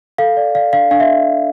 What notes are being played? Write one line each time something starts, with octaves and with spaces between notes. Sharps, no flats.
A4 F5
D5
D5 F5
D4 F5
D4 F5
E5